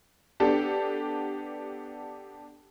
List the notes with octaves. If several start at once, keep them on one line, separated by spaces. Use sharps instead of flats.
B3 D4 G4 A4